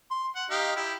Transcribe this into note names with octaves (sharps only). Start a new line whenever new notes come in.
C6
F#5
D#4 G4 F5
E4 G4